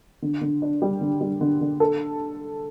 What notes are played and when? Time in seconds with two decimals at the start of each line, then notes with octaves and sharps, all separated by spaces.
0.22 D3
0.41 D3
0.62 D4
0.82 G3
1.01 D3
1.21 G3
1.41 D3
1.61 D3
1.80 A4